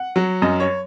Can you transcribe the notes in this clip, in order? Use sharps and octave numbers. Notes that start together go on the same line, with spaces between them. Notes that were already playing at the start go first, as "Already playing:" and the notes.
Already playing: F#5
F#3
F#2 D#5
C#5